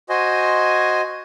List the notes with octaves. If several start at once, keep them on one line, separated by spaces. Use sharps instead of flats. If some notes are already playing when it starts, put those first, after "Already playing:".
F#4 C5 D#5 G#5